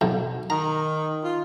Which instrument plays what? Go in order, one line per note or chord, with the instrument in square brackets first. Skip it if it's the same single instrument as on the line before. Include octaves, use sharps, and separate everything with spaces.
[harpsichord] B1 B2
[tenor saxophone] D#3 [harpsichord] A#5
[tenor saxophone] F4